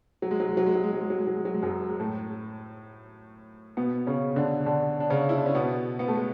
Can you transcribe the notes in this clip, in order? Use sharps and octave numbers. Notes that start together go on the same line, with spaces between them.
F#3
G#3
F#3
G#3
F#3
G#3
F#3
G#3
F#3
G#3
F#3
G#3
F#3
G#3
F#3
G#3
F#2 F#3
G#3
A2 A3
B2 B3
C#3 C#4
D3 D4
D3 D4
D4
C#3 C#4
E4
D4
C#4
B2 B3
B3
A3
G#3